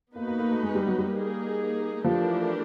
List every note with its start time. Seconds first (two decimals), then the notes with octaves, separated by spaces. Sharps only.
0.15 A#3 B3 D#4 F#4 B4
0.28 A#3
0.39 A#3
0.51 A3
0.63 G#3
0.75 G3
0.86 F#3
0.98 G3
1.11 A#3 D#4 G#4
2.04 E3 F3 A3 D4 G4 A#4